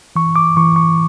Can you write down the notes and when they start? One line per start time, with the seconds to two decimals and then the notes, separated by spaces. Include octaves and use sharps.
0.16 E3 C#6
0.36 D6
0.57 E3 C#6
0.76 C#6